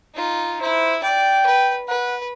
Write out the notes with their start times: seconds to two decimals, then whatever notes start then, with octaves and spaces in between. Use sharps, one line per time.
0.14 D#4 F4
0.61 E4 C5
1.03 D5 G5
1.46 B4
1.88 B4 F#5